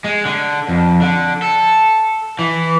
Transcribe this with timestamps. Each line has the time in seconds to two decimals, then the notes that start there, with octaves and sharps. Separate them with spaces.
0.04 G#3
0.26 D3
0.68 F2
1.02 D3
1.42 A4
2.39 E3